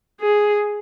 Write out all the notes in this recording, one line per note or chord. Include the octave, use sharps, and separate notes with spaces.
G#4